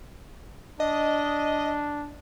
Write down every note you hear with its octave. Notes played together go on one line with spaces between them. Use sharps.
D4 D#5